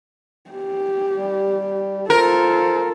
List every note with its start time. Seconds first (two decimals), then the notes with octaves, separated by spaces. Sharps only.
0.51 G4
1.15 G3
2.10 F4 A4 A#4 C5